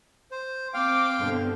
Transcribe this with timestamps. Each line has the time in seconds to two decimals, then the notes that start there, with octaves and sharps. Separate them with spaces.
0.31 C5
0.74 C4 F5 G5 D6
1.20 G2 B2 D3